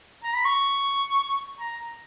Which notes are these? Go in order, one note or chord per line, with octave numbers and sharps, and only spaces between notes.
A#5
B5
C#6
A#5